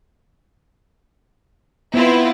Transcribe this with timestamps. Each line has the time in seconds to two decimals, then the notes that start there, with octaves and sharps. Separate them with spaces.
1.94 B3 C4 E4 F4